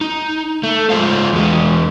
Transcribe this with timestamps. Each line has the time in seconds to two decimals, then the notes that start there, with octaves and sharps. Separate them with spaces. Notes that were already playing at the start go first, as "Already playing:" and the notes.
0.01 D#4
0.63 A3
0.90 G#3 F4 G#4 C5 F5
1.33 E2 G#3